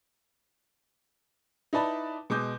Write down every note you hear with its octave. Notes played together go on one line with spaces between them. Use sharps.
D#4 E4 B4 D5 A5 B5
B2 G#3 D6 G6